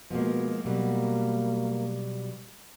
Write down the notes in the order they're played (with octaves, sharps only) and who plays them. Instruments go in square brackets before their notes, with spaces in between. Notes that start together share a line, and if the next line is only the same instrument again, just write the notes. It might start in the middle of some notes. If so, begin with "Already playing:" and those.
[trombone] B2 [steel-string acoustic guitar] F3 G#3 A#3
[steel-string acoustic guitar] B2 F#3 G3 [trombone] A#3